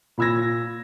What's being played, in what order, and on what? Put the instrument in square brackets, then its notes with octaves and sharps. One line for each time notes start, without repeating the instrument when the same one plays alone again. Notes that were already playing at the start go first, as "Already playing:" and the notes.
[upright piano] A#2 B5 E6 G#6 A#6